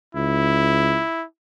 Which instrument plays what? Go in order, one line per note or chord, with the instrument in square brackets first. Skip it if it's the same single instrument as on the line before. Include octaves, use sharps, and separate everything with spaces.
[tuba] C#2 [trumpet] E4